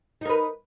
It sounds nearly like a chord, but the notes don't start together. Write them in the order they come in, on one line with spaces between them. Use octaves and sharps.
D#4 A#4 B4